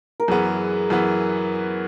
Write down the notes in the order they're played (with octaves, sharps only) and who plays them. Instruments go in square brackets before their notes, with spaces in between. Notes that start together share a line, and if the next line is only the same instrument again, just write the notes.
[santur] A#4
[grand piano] F#2 E3 B3 [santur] G#4
[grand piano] F#2 E3 B3